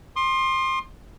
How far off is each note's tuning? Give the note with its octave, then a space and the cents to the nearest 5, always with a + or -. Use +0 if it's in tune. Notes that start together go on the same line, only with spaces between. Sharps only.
C6 +20 D#6 -45